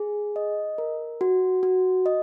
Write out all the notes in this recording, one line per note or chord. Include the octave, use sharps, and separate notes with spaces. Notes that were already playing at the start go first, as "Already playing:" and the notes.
Already playing: G#4
D#5
A#4
F#4
F#4
D#5